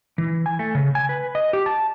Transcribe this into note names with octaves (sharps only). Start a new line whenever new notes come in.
E3
G#5
A3
C#3
G#5
B4
D#5
G4
A5